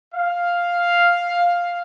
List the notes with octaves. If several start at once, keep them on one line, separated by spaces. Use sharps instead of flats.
F5